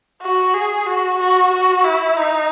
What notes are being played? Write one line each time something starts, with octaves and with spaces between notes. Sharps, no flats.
F#4
G#4
F#4
F#4
F#4
E4
D#4